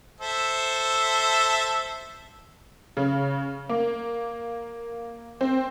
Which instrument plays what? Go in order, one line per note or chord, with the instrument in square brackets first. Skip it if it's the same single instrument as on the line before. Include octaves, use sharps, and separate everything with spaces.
[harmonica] A4 C5 E5
[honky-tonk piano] C#3
A#3
C4